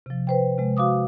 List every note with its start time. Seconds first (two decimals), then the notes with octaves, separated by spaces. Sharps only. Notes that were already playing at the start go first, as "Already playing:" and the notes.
0.06 C3 F3
0.27 B4 C5 G5
0.58 C3 G#3
0.77 F#4 F5 D6 D#6